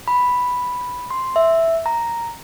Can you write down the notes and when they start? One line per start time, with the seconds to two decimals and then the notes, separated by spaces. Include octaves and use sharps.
0.08 B5
1.10 C6
1.36 E5
1.86 A#5